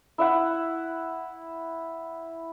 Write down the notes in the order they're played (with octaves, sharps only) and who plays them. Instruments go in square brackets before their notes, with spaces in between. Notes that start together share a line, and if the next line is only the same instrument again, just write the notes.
[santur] E4 E5 F#5